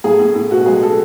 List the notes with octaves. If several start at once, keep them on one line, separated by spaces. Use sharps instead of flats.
A2 G#4
A2
A2
B2 F#4
G#3 G#4
A4